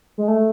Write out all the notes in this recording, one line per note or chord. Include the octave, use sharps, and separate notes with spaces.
G#3
A3